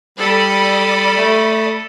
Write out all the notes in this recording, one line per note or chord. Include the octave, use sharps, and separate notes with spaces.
G3 A4 D5 B5 D#6
A3